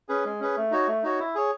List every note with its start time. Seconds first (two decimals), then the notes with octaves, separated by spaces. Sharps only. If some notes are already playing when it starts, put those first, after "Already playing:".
0.09 C#4 G#4 B4
0.25 G#3
0.40 C#4 G#4 B4
0.57 A3
0.71 D#4 F#4 C#5
0.88 A3
1.03 D#4 F#4 C#5
1.20 E4
1.35 G#4 C#5